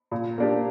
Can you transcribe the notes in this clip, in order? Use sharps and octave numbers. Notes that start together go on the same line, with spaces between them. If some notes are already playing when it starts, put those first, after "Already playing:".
A#2
A#3 D4 G4